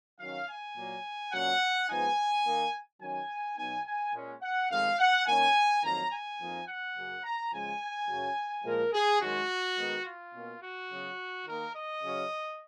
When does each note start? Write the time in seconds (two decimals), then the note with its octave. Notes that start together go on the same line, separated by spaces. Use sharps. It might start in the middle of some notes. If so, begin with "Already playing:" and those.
0.19 D#3 F#3 C#4 F5
0.48 G#5
0.76 A#2 F#3 A#3
1.32 A#2 F#3 C#4 F#5
1.88 G#2 F3 B3 D#4 G#5
2.45 D#3 A#3 D#4
3.01 D#3 F#3 C#4 G#5
3.57 B2 F#3 B3 D#4 G#5
3.86 G#5
4.14 A#2 G#3 C#4
4.42 F#5
4.70 F2 D#3 G#3 D#4 F5
4.98 F#5
5.27 D#3 A#3 C#4 G#5
5.83 F2 D#3 F#3 A#3 A#5
6.11 G#5
6.39 F2 F3 A#3 D#4
6.67 F#5
6.96 F#2 C#3 F#3 A#3 C#4
7.24 A#5
7.52 C#3 F3 G#3 G#5
8.08 F#2 C#3 F#3 C#4
8.64 A#2 F3 G#3 A#4
8.93 G#4
9.21 F#2 D#3 G#3 C#4 F#4
9.77 D#3 G#3 B3 D#4
10.05 F4
10.33 B2 A#3 C#4
10.62 F#4
10.90 C#3 F#3 B3
11.46 D#3 A#3 D#4 A#4
11.74 D#5
12.02 C#3 F#3 C#4